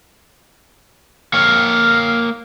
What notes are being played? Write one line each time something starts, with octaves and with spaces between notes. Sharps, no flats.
A#3 C#5 F6